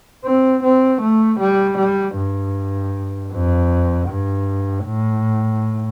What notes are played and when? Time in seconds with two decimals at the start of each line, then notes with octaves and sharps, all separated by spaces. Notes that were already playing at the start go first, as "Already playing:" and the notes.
0.25 C4
0.63 C4
1.01 A3
1.40 G3
1.78 G3
2.17 G2
3.33 F2
4.09 G2
4.86 A2